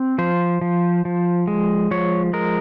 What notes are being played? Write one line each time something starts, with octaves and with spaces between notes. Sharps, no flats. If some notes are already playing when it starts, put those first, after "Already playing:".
Already playing: C4
F3 C5
F3
F3
G#3
F3 C#5
G#3 A#4